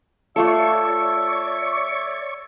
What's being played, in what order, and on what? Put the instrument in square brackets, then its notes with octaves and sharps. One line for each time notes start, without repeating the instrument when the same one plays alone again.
[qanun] A3 F4 A4 [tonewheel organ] C#5 D5 C#6 [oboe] E5